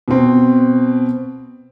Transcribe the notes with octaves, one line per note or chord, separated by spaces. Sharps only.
B2 C4